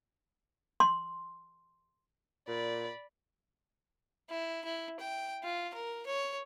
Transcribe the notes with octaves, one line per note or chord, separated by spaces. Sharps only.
C6
A#2 D5 B5
E4
E4
G5
F4
A#4
C#5